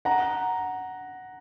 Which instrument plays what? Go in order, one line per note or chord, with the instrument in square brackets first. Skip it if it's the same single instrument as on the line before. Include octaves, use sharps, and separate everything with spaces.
[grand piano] F#5 A#5